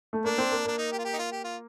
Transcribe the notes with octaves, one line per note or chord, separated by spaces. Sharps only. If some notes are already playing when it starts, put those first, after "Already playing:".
A3
A#3 D4
C4
A#3
A#3 D4
D#4
G4
F4
G4
D#4
F4
G4
F4